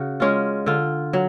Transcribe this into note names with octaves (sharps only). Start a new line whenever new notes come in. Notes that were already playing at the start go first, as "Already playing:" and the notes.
Already playing: C#3 F#4
G#3 C#4 F4
D3 F4
F#3